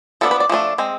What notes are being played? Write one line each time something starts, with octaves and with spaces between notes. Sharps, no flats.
F3 B3 D4 A4
B4
D5
F3 A3 D4
G#3 C4